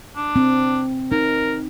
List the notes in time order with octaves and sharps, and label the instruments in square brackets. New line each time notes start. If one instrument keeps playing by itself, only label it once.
[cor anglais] D4
[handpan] C4
[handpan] D#4 [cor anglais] A#4